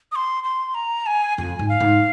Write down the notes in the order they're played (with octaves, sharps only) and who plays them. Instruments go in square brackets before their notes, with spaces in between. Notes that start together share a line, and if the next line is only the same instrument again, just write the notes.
[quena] D#6
C6
C6
A#5
G#5
[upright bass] F2 [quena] G#5
[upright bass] G#2
[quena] F5
[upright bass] G#2